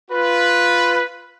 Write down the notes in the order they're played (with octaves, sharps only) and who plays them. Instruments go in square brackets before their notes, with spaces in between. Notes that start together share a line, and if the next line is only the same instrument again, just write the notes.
[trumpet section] F4 B4